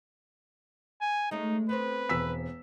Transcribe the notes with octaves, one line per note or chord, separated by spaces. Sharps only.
G#5
G#3 A3 C#4 D#4
B3 C4 B4 C5
E1 E6 B6